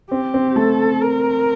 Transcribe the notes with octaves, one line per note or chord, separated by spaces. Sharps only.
C4 G4
C4
A3 A4
A#4